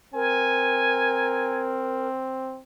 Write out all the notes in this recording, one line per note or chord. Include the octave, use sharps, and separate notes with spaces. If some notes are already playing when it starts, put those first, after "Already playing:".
C4 A#4 G#5